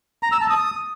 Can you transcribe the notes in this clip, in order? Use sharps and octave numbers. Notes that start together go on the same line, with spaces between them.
A#5
E6
A5
D#6